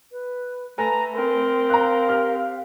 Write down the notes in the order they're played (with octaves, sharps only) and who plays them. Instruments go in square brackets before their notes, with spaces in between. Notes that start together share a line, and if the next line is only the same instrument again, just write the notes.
[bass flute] B4
[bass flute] A3 [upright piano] A4 B4 G#5 [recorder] A#5
[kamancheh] C4 [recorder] A#4
[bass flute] F5 [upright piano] A#5 F#6
[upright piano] G4 F6